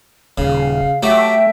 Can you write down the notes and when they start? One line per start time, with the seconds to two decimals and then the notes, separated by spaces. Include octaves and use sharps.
0.38 D#1 C#3 F5
1.03 F#3 A3 F#4 G4 E5 G5